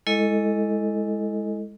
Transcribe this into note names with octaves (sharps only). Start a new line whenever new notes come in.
G#3 E4 A4 D#5